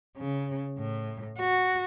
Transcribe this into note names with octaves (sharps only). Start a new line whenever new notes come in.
C#3
A2
F#4